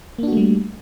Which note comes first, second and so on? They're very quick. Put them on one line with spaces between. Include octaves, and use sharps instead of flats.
A#3 D4 F#4 A3 G3